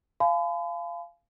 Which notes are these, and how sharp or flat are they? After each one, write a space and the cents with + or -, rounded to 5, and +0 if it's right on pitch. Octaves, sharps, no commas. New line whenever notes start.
F5 -15 G#5 +35 B5 +40